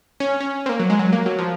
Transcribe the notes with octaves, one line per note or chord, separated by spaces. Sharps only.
C#4
C#4
C4
A#3
F#3
G#3
F#3
A#3
F#3
F3